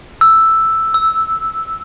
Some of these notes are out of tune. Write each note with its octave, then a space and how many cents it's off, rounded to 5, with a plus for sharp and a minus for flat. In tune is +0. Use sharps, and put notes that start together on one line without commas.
E6 +0
E6 -10